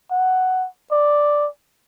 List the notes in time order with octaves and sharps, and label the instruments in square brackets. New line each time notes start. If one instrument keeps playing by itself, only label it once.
[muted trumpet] F#5
D5